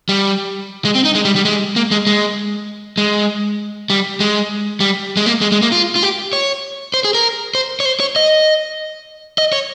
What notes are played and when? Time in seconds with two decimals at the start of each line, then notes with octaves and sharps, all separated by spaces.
0.09 G3
0.85 G#3
0.95 C4
1.05 D#4
1.15 G#3
1.25 G3
1.36 G3
1.45 G#3
1.76 A#3
1.91 G#3
2.07 G#3
2.97 G#3
3.90 G3
4.20 G#3
4.80 G3
5.17 G#3
5.26 A#3
5.41 G#3
5.52 G#3
5.62 A#3
5.72 F4
5.96 F4
6.03 G4
6.33 C#5
6.94 C5
7.04 G#4
7.14 A#4
7.55 C5
7.80 C#5
7.85 C5
8.00 C#5
8.16 D#5
9.38 D#5
9.52 C#5